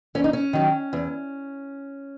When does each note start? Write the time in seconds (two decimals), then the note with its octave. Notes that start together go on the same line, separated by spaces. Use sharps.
0.15 E2 C#4
0.24 D#4
0.33 C#4
0.53 D#3 F#3
0.93 E2